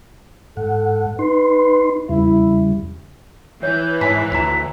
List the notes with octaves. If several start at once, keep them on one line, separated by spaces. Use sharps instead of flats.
G#2 A4 F#5
D#4 B4 C6
E2 C#3 G3 E4
E3 C#5 G6
G#2 C#5 G#5 B5 B6
D2 F4 F#4 A#5 B6